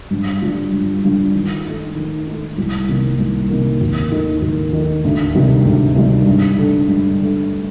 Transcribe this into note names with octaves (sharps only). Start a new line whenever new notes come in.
G2
D3 G3 D4 F4
G2
D3 G3 D4 F4
D#3
A3 D#4
D#3
A3 D#4
C2
C3 D#3 A#3
C2
C3 D#3 A#3
D#2
D#3 A3
D#2
D#3 A3
D2
C3 D#3 G3
D2
C3 D#3 G3
G2
D3 A3
G2
D3 A3